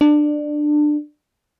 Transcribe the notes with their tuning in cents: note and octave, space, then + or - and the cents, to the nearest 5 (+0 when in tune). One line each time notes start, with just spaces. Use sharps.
D4 +20